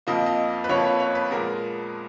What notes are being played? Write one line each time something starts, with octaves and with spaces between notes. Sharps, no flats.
F2 F3 A#3 D#5
D#5
B4
F2 F3 A#3 C#5
C#5
C#5
B4
A#2 G#3 B3 A#4